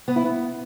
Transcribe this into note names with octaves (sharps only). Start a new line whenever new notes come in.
B3
E4
B3